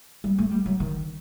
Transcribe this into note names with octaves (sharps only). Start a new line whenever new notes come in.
G3
A3
G3
F#3
D#3